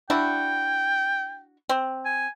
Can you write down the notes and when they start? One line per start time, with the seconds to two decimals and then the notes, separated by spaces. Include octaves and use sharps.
0.10 D4 E4 F#4 G5
1.69 C4
2.05 G#5